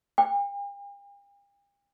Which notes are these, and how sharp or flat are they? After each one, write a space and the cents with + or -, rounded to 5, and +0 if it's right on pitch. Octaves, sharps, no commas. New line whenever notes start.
G5 +45